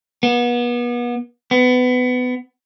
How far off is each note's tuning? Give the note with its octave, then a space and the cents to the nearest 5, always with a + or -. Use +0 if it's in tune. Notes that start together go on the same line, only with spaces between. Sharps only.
B3 -35
B3 +25